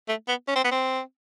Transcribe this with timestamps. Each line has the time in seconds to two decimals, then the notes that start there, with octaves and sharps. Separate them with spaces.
0.08 A3
0.28 B3
0.48 C#4
0.55 C4
0.64 B3
0.71 C4